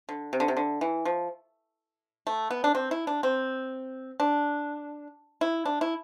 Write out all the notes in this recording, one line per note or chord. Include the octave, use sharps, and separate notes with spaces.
D3
C3
D3
C3
D3
E3
F3
A3
B3
D4
C4
E4
D4
C4
D4
E4
D4
E4